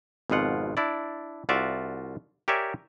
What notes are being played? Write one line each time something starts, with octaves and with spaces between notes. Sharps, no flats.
G#1 F2 B2 F4 F#5
D4 E4 D5
C2 F4 F#4 D5 E5
G4 A#4 C#5 D5 E5 G#5